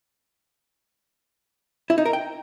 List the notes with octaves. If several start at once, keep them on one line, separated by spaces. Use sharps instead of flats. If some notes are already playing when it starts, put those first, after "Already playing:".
E4
D#4
A#4
G5